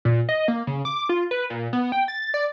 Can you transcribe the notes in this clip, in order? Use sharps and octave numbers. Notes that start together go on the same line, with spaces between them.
A#2
D#5
A#3
C#3
D6
F4
B4
A#2
B3
G5
A6
D5